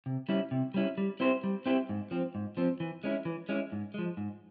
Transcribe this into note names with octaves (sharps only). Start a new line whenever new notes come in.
C3
G3 C#4 E4
C3
G3 C#4 E4
G3
C4 E4 G4 C5
G3
C4 E4 G4 C5
G#2
F3 C4
G#2
F3 C4
E3
G#3 C#4 E4
E3
G#3 C#4 E4
G#2
F3 G#3
G#2